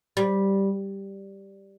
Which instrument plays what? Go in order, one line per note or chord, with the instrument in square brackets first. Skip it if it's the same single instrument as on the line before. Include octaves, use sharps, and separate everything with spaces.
[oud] G3